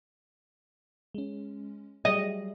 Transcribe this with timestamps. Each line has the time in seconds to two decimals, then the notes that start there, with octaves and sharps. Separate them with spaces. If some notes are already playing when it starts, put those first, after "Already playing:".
1.14 G#3 C#4
2.05 F#3 G3 G#4 D#5